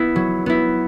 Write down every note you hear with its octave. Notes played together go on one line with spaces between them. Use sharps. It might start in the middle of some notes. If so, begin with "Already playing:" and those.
Already playing: B3 E4
F#3
B3 E4